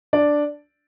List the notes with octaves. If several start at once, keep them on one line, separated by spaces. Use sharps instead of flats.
D4 D5